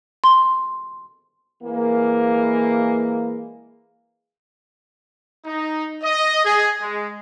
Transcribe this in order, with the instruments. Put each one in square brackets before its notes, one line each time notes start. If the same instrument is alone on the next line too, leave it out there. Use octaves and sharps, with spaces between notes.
[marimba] C6
[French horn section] E3 G#3 A#3
[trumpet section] D#4
D#5
G#4
G#3